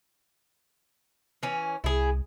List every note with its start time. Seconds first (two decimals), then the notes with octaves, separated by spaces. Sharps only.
1.43 E3 C#4
1.84 C2 E4 G#4